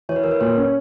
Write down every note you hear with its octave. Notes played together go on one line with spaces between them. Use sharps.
E3 C#5
B4
E3 A#4
B4
A#2 C#5
C#4